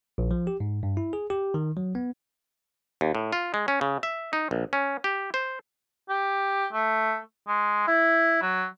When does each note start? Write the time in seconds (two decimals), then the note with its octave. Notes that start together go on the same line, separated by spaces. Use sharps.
0.18 A#1
0.31 F3
0.47 G4
0.60 G#2
0.83 G2
0.97 E4
1.13 G#4
1.30 G4
1.54 D#3
1.77 F#3
1.95 B3
3.01 D#2
3.15 A2
3.33 F4
3.54 G#3
3.68 C#4
3.81 C#3
4.03 E5
4.33 D#4
4.51 A#1
4.73 C#4
5.04 G4
5.34 C5
6.09 G4
6.73 A3
7.48 G#3
7.87 E4
8.42 F#3